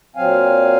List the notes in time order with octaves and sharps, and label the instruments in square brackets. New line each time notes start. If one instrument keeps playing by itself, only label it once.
[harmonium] A#2 F#3 C4 F5 G#5